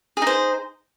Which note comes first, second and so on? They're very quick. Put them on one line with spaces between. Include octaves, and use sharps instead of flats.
G#4 D#4 C5